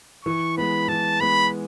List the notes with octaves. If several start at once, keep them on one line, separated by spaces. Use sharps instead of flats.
E3 C#6
G#3 B3 B5
E3 A5
G#3 B3 B5